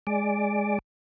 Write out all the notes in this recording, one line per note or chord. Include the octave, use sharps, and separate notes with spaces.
G#3 D5